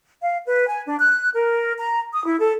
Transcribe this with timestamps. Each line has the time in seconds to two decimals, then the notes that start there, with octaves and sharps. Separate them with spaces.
0.21 F5
0.46 B4
0.69 G#5
0.87 D4
0.99 F#6
1.34 A#4
1.78 A#5
2.12 D#6
2.26 E4
2.39 A4